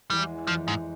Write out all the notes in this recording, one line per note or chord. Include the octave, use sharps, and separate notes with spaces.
E2 E3 G3 G#3
F2 E3 F3 G#3
G#2